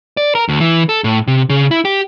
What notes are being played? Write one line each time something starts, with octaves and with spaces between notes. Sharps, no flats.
D5
A#4
D2
E3
A4
A2
C3
C#3
E4
G4